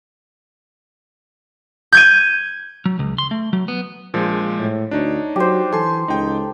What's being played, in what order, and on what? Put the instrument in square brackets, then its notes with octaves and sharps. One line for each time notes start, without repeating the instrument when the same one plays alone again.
[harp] G6 G#6 D#7
[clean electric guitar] F#3
C#2
C6
A3
F#3
B3
[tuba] A#1 [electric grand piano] A#2 F3 G#3
[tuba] A2
[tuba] D2 [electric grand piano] D4 D#4 C#5
[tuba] F#3 [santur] G4 C5
[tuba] E3 [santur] A4 [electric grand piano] G#5 C6
[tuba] C#2 [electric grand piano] D#4 G5